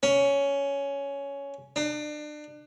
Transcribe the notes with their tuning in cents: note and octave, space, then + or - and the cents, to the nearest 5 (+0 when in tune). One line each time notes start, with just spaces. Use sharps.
C#4 +10
D4 +35